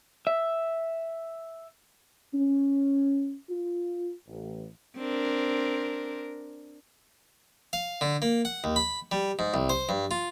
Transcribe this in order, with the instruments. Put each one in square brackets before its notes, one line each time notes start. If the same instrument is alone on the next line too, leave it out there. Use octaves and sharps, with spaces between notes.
[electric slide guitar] E5
[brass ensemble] C#4
F4
A1
[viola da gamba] C4 D4 A#4
[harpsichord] F5
D3
A#3
F#5
D#2
B5
G3
G#2
C2
C5
G2
F4